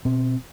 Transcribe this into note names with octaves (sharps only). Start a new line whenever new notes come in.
B2 C4